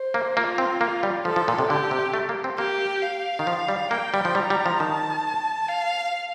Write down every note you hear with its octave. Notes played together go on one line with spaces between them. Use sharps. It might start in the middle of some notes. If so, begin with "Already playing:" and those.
Already playing: C5
A#3
A#3 F4
C4
A#3
G3
F3 A4
F3
A#2
C3
D3 G4
C3
A3
A#3
C4
A#3 G4
F5
D#3
F3
G3
A#3 G5
G3
F3
G3 A#5
G3
F3
D#3 A5
F5